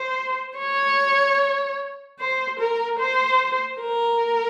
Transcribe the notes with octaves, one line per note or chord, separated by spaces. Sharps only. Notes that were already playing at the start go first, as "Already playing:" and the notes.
Already playing: C5
C#5
C5
A#4
C5
A#4